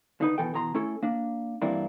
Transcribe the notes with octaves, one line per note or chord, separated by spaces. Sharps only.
D3 D#4 B4
B2 E3 A4 G5
B2 E3 A#5 C6
A3 C#4 E4 A4
A#3 D4
G2 E3 A#3 C4 D4 E4